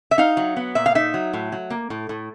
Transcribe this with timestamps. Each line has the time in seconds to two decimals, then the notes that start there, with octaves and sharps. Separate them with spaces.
0.11 E5
0.18 D#4 F5
0.37 F#3
0.56 B3
0.75 A#2 E5
0.86 F5
0.95 D#4 E5
1.14 F#3
1.33 A2
1.52 F#3
1.70 A#3
1.90 A2
2.09 A2